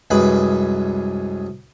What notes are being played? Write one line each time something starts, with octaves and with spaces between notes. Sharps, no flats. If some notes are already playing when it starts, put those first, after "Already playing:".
C2 F#2 G#3 B4 B5